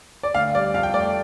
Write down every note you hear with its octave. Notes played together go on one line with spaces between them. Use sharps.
D5
D2 F5
G3 D5
F2 F5
G5
A3 D5